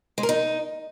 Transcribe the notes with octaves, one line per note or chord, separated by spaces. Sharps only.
G#3
A#4
D#4